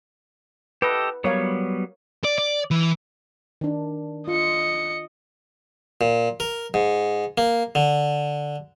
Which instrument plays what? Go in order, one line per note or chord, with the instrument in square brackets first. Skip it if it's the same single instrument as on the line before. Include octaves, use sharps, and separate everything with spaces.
[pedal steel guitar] G4 A4 D#5 [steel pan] B4
[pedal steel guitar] F#3 G3 B3 [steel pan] A#4 C#5 F5
[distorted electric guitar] D5
D5
E3
[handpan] D#3 D4
[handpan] F4 [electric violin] D#5 C#7
[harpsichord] A#2
A#4
G#2
A#3
D3